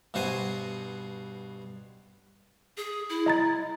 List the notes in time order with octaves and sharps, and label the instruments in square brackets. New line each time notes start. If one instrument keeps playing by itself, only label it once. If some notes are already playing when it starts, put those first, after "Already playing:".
[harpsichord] G2 B2 F#4 C5 G#5
[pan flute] G#4
E4
[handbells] D#5 A#5 A6